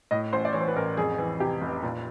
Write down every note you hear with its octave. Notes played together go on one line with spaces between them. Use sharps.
A2 D#5
A1 C5
D5
E3 C#5
C5
B4
A1 A#4
F2 G#4
E3
C3 G4
F1
A#2